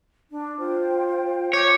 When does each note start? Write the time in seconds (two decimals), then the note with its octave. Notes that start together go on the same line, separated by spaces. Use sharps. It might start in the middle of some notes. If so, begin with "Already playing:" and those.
0.30 D4
0.59 F4 C5 G5
1.53 F4 C#5 D6 G6